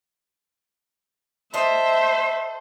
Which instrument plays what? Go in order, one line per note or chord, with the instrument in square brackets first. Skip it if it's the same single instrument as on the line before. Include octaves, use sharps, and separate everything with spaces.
[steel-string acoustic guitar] A4 D#5 [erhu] C5 [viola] E5